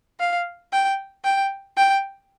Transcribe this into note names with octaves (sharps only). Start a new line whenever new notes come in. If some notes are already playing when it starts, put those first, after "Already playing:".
F5
G5
G5
G5